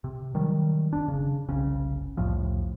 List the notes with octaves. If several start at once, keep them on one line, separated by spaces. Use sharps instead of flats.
C3
D#3 F#3 G3
F#1 D4
C#3
F#1 C2 C#3 C#4
C2 F2 A2 F3